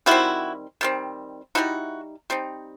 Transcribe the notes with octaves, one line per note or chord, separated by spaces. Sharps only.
D#3 G3 C4 E4 F#4
D#3 G3 C4
G3 C4 D#4 E4 F#4
G3 C4 D#4